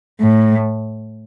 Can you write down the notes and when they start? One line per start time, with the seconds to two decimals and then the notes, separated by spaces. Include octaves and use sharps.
0.20 A2